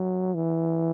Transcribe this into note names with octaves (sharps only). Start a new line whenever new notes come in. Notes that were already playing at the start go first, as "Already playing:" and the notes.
Already playing: F#3
E3